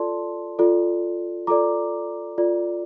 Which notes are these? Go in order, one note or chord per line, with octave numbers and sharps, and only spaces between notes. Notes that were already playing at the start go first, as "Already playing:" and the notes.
Already playing: F4 A4 D5 A5 C6
F4 A4 D5
F4 A4 D5 A#5 D6
F4 A4 D5